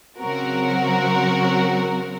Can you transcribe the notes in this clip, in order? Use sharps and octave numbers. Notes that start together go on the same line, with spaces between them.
C#3 F#3 C4 F#4 A#4